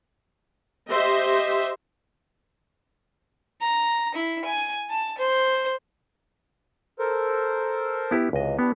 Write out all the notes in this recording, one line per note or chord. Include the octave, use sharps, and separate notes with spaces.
G4 C5 D#5 E5
A#5
E4
G#5
A5
C5
A4 A#4 C5
B3 E4 G4
C#2 C3 E3 D#5
B3 D4 E4 G4